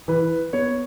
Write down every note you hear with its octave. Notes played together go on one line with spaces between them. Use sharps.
E3 B4
B3 C#5